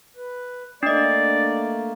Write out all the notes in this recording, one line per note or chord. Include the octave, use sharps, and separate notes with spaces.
B4
A3 A#3 D4 D5 D#5